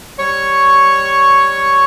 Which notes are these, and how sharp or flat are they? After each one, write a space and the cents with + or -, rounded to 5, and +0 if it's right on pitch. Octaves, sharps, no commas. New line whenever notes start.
G3 +0 C#5 +0 C#6 +0